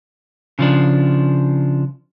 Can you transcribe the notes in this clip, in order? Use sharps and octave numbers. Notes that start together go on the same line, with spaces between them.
C#3 F3 D4